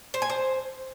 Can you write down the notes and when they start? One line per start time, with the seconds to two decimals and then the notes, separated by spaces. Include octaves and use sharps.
0.14 C5
0.22 G#5
0.30 C5